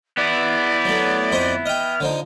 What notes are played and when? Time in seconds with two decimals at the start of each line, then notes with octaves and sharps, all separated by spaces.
0.17 B3 E4 D5
0.85 F#3 A3
1.32 F2 C5 D#5
1.66 D#5 G5 F6
2.00 D3 F3 D#4